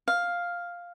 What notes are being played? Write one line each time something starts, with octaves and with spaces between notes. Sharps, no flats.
F5